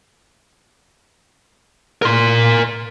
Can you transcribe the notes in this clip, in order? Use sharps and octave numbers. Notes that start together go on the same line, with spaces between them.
A#4 C6